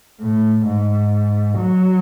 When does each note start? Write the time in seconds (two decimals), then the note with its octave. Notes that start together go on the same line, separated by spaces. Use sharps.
0.22 A2
0.67 G#2
1.59 F#3